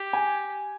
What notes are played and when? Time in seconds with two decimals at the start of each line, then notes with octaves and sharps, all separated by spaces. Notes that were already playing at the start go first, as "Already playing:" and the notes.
Already playing: G4
0.13 G#5